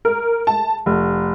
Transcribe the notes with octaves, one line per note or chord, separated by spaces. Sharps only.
A#4
A5
F1